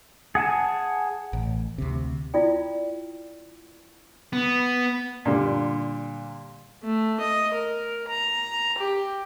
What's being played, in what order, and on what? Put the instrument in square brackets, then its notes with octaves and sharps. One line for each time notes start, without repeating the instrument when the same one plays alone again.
[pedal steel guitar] G#4 F#5 G#5 A5
[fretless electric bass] A1
D2 C3
[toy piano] E4 F4 D5 G5
[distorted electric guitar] B3
[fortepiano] A#2 D3 G3
[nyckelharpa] A3
D#5
A#4
A#5
G4